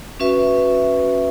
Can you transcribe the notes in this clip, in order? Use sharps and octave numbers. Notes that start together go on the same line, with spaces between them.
C#4 F#4 B4 E5